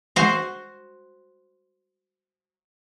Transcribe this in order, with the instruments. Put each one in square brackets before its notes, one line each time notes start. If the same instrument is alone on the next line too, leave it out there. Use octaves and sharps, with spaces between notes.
[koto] F#4 C5